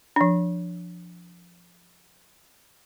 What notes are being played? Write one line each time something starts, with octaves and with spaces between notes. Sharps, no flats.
F3 D4